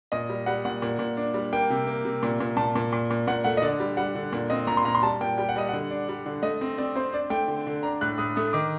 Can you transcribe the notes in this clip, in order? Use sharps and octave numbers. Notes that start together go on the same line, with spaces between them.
A#2 D#5
G3
G3 F#5
A#2 F#5
A#2
A#2
D4
G3
A#3 G5
C3
A#3
C3
A#2
A#2
A#2 A5
A#2
A#2
A#2
A#2 F#5
A3 F#5
D#5
D3 D5
G3
G3 F#5
D3
A#2
C4 D#5
A#2 A#5
C6
A#2 A#5
C6
G3 A5
A#2 G5
G3 G5
F#5
G3 D#5
D3 F#5
D4
G3
D3
A3 D#5
C4
C4 D5
C4 C5
D4 D5
A3 G5
D3
D3
D4 A#5
A2 F#6
A2 D#6
A3 D#6
D#3 D6